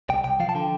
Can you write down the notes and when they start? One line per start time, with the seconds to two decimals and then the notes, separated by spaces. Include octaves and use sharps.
0.09 C2 G5
0.24 C2 G5
0.40 F3 F5
0.49 A5
0.55 D3 G5